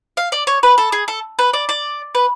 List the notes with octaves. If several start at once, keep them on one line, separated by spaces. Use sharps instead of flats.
F5
D5
C#5
B4
A4
G#4
A4
B4
D5
D5
B4